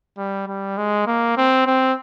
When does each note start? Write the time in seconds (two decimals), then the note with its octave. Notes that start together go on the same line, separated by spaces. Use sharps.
0.18 G3
0.48 G3
0.77 G#3
1.07 A#3
1.37 C4
1.66 C4